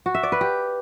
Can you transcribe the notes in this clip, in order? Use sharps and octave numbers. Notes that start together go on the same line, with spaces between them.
F#4
E5
D5
B4
G4